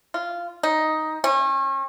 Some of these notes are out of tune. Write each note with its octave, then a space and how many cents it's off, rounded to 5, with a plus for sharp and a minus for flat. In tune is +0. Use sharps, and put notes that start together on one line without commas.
F4 -10
D#4 +5
C#4 -35